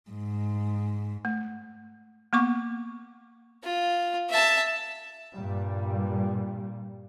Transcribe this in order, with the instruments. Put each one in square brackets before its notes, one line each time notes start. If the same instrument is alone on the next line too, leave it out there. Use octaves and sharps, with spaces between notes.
[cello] G#2
[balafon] A3
A#3 B3 C#6 D6
[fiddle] F4
E5 A5
[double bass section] G2 A#2 G3